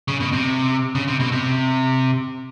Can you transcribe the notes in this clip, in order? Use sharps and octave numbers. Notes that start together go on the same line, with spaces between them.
C#3
B2
C3
C#3
C3
B2
C3